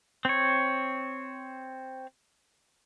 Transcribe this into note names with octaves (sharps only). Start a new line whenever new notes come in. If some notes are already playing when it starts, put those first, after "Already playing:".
C4 C#5